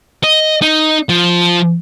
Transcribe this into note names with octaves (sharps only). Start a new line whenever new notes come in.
D#5
D#4
F3